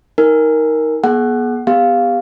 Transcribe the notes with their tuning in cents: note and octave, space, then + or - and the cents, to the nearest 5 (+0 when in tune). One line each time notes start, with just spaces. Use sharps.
D#4 +20 A#4 +0 G#5 -10
B3 -40 G#4 +30 F#5 +10
B3 +10 G4 +35 F5 +0